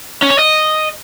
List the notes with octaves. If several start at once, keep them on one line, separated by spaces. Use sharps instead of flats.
C#4
C#5
D#5